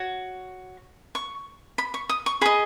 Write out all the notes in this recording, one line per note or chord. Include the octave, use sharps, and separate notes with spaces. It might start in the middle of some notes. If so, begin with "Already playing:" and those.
Already playing: F#4 C#5
C#6
B5
C#6
D#6
C#6
G#4 D#5 B5